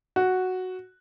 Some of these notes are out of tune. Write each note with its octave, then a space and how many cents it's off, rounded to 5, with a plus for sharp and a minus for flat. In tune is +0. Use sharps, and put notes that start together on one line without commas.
F#4 +0